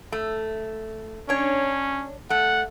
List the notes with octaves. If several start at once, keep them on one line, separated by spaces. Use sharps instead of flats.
A3
C#4 D4 C#5
A3 F#5